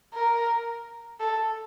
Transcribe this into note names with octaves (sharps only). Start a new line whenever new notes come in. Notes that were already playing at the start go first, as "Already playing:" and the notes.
A#4
A4